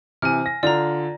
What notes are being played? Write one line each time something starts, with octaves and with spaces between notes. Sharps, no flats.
C3 E3 G#5 F6
A#6
D3 F4 D5 A#5